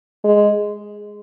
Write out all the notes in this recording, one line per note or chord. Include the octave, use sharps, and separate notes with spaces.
G#3